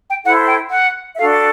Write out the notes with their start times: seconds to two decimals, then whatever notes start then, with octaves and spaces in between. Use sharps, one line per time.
0.08 G5
0.24 E4 A4 C5 F#5
0.47 G5
0.71 F#5
1.14 E5
1.17 D4 F#4 A4 F5